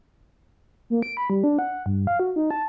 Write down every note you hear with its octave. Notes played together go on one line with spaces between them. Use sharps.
A#3
D7
B5
G3
D4
F#5
G2
F5
F#4
D#4
A5